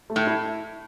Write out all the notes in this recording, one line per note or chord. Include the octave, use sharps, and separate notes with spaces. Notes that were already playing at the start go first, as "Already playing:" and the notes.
A3
A2
E4